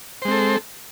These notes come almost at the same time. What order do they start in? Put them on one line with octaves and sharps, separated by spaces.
C5 G#3 C4 A4